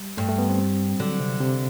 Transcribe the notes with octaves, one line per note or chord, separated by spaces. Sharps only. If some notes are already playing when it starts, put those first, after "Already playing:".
Already playing: G3
G2 A3
A3
B3
C4
D3 F#3
C3
C3